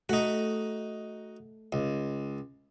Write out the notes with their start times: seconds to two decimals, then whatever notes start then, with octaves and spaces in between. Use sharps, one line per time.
0.09 A3 D#4 F#4
1.73 C#2